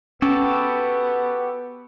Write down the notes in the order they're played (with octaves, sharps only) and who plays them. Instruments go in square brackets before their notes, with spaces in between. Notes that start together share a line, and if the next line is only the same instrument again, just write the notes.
[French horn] B3 [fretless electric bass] C#4 [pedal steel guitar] F#4 G4 A4